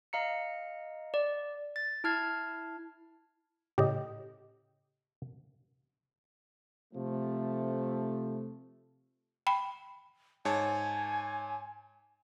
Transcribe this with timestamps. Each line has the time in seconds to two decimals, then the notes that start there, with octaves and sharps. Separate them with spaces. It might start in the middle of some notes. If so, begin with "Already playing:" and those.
0.13 D#5 F5 A#5 C#7
1.14 D5
1.76 A6
2.04 E4 A5 F6 G#6 C7
3.78 A2 C#3 G4 D#5
6.94 C3 F3 A3
9.47 G5 B5
10.45 G#2 C#5 G#5 A5